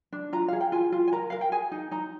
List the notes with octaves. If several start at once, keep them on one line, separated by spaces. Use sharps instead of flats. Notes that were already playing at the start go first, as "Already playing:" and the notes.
D4
F4 A#5
G#4 F5
G5
F4 G#5
F4
G#5
A#4 A#5
A#4 F5
G5
G#4 G#5
D#4
D#4 A#5